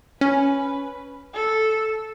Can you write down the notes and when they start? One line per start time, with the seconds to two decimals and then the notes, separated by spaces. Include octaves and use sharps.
0.21 C#4 B4
1.34 A4